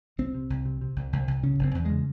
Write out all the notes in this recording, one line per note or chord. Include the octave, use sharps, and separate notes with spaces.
C2 C4
C3
C2
C3
C3
C2
C2
C2
C#3 C#4
F#1
C4
E2
C#3 G#3